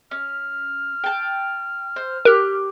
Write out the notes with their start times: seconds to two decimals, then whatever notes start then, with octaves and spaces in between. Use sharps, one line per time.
0.11 C#4 F6
1.04 G5 A5
1.96 C5
2.25 G4 A#4 F#6